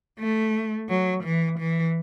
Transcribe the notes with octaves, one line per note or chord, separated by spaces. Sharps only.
A3
F#3
E3
E3